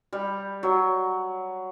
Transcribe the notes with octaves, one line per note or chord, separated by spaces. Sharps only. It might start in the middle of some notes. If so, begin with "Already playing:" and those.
G3
F#3